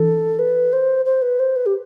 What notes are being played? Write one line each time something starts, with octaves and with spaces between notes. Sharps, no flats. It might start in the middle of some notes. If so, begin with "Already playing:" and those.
Already playing: E3 D4 A4
B4
C5
C5
B4
C5
B4
G4